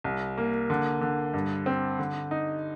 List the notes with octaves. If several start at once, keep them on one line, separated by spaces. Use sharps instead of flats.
C2
A#3
D3
D3
G2
C4
D3
D#4